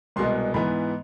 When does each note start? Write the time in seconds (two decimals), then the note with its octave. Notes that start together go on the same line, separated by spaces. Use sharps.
0.16 C2 B2 G#3 B3 C6
0.54 G#2 E3 B3 B5